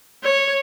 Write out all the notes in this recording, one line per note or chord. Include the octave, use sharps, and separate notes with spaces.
C#5